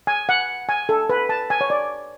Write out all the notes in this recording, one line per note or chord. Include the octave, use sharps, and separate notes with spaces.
G#5
F#5
G#5
A4
B4
A5
G#5
C#5
D5